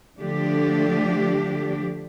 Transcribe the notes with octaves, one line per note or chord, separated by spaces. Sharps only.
D3 F3 A3 D4 G4